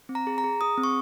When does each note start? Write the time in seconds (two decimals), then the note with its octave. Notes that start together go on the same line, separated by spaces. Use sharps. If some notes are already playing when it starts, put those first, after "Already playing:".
0.09 C4
0.15 A#5
0.27 G#4
0.38 A#5
0.44 G#4
0.61 G#4 D#6
0.78 C4
0.83 C#6